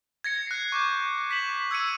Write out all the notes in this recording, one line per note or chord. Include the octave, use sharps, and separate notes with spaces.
G#6 A#6 C#7
F#6 C7
C#6 D6 G6
B6 E7 F#7
E6 G#6 C#7 D#7